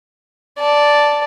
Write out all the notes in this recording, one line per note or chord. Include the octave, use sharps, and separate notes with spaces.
D5 A5